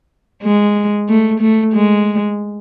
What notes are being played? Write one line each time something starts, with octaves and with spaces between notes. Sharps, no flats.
G#3
A3
A3
G#3